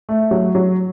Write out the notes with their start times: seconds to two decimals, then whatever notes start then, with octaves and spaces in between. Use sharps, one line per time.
0.09 A3
0.31 F#3
0.55 F#3